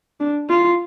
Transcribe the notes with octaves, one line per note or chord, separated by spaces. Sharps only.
D4
F4